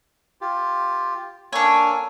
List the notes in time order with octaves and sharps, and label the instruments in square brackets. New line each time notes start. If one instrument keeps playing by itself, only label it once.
[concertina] F4 G4
[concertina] A#3 A4 G#5 [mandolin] D4 C#5